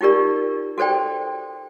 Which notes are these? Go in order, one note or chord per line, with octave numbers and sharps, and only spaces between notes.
D#4 F4 G4 A#4 D5
F#4 A4 C5 D5 G5